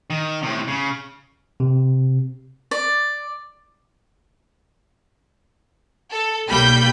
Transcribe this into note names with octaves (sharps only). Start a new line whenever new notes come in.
D#3
A2 C3
C#3
C3
D5
A4
B1 G3 A#3 G5 B5 G6